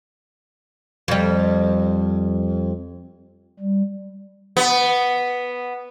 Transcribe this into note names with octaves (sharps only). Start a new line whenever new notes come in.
F2 G3
G3
B3